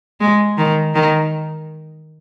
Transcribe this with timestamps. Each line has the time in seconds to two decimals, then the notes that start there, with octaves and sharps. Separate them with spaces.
0.21 G#3
0.58 D#3
0.95 D#3